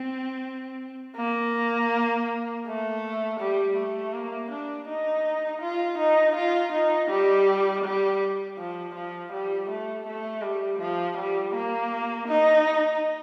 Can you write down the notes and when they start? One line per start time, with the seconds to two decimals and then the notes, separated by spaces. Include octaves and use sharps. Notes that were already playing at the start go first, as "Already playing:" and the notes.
Already playing: C4
1.17 A#3
2.66 A3
3.40 G3
3.77 A3
4.14 A#3
4.51 D4
4.88 D#4
5.62 F4
5.98 D#4
6.36 F4
6.73 D#4
7.10 G3
7.84 G3
8.59 F3
8.95 F3
9.33 G3
9.70 A3
10.07 A3
10.43 G3
10.79 F3
11.17 G3
11.54 A#3
12.28 D#4